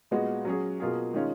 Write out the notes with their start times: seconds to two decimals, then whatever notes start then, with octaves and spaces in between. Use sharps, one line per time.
0.11 A#2 G#3 B3 F#4
0.45 F#3 C#4 G#4
0.80 B2 A#3 F4 G#4
1.14 D#3 G#3 C#4 F4